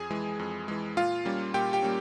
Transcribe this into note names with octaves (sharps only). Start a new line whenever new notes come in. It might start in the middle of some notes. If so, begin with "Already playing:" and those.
Already playing: F2 G#4 G#5
E3 G#3
F2
E3 G#3
A#2 F4 F5
G3 A#3 C#4
A#2 G4 G5
G4 G5
G3 A#3 C#4